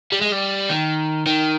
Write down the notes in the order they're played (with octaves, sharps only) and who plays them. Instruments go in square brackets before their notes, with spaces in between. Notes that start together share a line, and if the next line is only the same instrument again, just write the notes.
[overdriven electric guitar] G3
G#3
G3
D#3
D#3